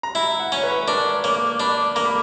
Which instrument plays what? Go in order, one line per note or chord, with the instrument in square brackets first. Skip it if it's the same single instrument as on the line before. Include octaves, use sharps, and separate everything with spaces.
[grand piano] A#5
[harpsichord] E4 [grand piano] B5
[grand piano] F#5
[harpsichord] C#4
[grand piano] C#5
B4
[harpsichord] D4 [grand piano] A#4
[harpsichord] A#3 [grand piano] C#5
[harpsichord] D4 [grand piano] B5
[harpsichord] A#3 [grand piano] A#5
[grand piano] B5